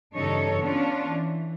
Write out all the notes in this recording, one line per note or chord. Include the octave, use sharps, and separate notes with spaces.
E2 G2 C#3 D#4 A4 C#5
B3 C#4 D4 F4 C#5
E3